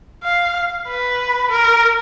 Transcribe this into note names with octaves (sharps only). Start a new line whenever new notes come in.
F5
B4
A#4